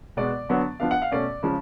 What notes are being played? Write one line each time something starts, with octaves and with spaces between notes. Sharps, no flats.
B2 G#3 B3 D5
D3 F#3 B3 D4
F3 B3 D4 F5
F#5
F5
B2 A3 C#4 D5
C#3 F3 G#3 C#4